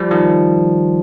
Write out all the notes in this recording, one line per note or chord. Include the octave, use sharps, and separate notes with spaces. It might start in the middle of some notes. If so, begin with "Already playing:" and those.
Already playing: F3 G3
D#3 F3